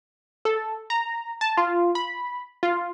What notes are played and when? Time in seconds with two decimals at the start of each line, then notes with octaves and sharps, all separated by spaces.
0.45 A4
0.90 A#5
1.41 A5
1.57 F4
1.95 B5
2.63 F4